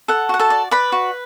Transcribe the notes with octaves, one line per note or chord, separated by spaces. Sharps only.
A4 F#5
F#4 F#5
A4 A5
D5
B4 D5 B5
F#4